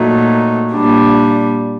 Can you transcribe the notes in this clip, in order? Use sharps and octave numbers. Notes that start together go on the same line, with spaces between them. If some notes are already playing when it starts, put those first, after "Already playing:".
Already playing: A#2 F#3 A3 D#4
A#2 G3 D4